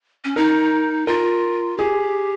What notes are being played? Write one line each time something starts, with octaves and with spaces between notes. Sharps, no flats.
C#4
D#4 A#4
F4 A#4
G4 G#4